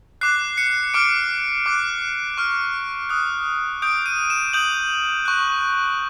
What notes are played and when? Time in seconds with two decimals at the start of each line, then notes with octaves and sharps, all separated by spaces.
0.21 D6 F#6 C7
0.58 C#7
0.94 D6 F6 D7
1.66 D6 F#6
2.37 C#6 F6
3.09 D#6 F#6
3.82 D#6 G6 D7
4.06 D#7
4.30 E7
4.53 D#6 G6 F#7
5.25 C#6 F#6